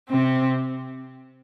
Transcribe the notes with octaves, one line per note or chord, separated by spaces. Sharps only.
C3 C4